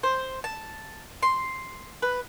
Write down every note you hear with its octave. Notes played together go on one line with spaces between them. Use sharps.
C5
A5
C6
B4